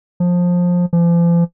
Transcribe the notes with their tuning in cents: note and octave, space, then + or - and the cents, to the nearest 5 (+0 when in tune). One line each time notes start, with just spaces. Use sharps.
F3 +20
F3 -40